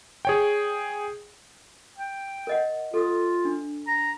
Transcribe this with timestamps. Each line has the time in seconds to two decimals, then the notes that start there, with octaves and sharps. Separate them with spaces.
0.25 G#4 C#5 G5
1.98 G5
2.47 A#4 D#5 F#5
2.94 F4 A4 D#6
3.45 D4
3.88 A#5